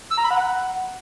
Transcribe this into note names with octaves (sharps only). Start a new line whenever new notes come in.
E6
A#5
B5
F#5